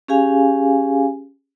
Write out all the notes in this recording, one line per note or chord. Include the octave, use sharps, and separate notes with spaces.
C#4 G4 G#4 F5 G#5